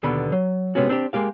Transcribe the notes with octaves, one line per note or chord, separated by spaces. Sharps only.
D#2 B2 D3 B3 B5
F#3
C3 G#3 B3 C#4 F#4
C4 D4 F4 G4
G#3 A#3 G4 F5